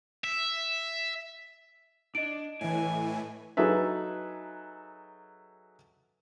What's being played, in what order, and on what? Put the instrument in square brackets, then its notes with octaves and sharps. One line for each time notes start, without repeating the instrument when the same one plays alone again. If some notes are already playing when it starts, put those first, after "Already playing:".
[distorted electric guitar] E5
[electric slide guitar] D4 [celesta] D#5 D7
[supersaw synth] A2 E3 [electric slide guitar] G#5
[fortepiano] F#3 D#4 G#4 A4 B4 E5